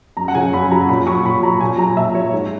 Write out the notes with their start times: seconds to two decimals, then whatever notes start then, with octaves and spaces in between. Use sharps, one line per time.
0.17 F#2 A#5
0.28 F#5
0.35 C#3 F#3 G#5
0.53 F#2 B5
0.71 C#3 F#3 A#5
0.89 A#2 B5
1.07 F#3 C#6
1.24 A#2 B5
1.43 F#3 A#5
1.60 A#2 G#5
1.78 F#3 A#5
1.97 A#2 E5
2.14 F#3 C#5
2.33 G#2